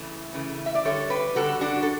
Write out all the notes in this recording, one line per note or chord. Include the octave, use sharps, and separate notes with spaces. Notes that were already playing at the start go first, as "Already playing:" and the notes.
Already playing: C#3 E3 A3
C#3 E3 A3
E5
D5
D3 G3 A4 C#5
G4 B4
D3 G3 F#4 A4
D4 F#4
A4